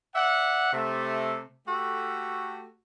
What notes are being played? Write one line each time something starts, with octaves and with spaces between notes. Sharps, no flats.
D5 E5 F#5
C3 A3
A3 F#4 G4 A4